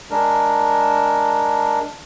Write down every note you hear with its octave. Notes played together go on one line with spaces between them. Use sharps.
G#3 D4 A#4